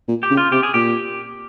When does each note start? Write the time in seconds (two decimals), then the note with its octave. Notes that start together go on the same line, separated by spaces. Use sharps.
0.08 A#2
0.23 G4
0.31 C#3
0.37 F4
0.52 C3 G4
0.63 G#4
0.74 A#2 G4